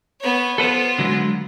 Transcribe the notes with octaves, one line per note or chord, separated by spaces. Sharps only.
B3 C#5
B3 F4 A4 B4 C5
D3 F#3 G#3